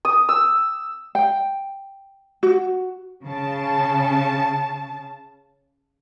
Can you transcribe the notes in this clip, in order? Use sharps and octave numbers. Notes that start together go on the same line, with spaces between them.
D#6
E6
G5
F#4
C#3 A5